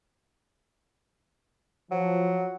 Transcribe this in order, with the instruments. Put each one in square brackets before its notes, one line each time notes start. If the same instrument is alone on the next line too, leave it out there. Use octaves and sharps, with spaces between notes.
[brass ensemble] F3 [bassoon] F#3